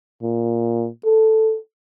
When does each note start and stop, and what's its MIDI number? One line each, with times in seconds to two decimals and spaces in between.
0.23 0.88 46
1.05 1.57 69